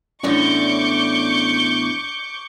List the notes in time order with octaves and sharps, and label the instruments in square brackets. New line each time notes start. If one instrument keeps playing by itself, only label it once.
[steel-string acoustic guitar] E2 A2 D3 [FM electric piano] C#4 D5 [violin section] C#6 D6 G6